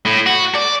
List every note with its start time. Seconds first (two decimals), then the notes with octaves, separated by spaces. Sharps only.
0.05 A2
0.26 F#4
0.55 D5